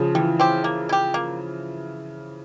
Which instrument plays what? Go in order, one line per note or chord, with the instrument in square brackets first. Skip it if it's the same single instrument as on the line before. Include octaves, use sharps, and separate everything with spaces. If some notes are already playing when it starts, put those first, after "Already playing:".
Already playing: [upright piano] C#3 F3
[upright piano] E3 [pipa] G3
[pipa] C4 G4
A#3
E4
G4
A#3